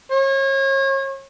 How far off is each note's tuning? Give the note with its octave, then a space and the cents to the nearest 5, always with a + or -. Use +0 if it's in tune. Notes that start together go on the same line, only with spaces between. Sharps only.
C#5 -35